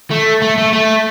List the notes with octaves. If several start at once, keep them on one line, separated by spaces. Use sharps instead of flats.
A3
A3
A3
A3